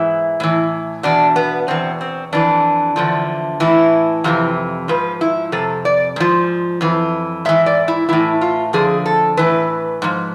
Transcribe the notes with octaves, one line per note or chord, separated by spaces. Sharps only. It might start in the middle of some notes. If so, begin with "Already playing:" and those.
Already playing: G#2 E3 E4
A2 E3
E2 B2 D4
B3
E2 B2 C4
C4
F2 E3 D4
E2 D3 F3
A2 E3 E4
F2 C3 E3
G#2 F3 B4
E4
F2 C3 A4
D5
G#2 F3
F2 E3
G#2 E3 E5
D5
E4
A2 E3 E4
F4
F2 D3 F3 G#4
A4
A2 E3 B4
G#2 F3